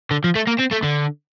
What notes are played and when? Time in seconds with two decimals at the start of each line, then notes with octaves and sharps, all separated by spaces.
0.11 D3
0.24 F3
0.36 A3
0.47 A#3
0.60 C4
0.72 A3
0.84 D3